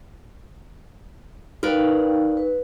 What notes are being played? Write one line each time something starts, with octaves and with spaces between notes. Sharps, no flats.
D#4 A#4 B4 D5 F5 G5
B4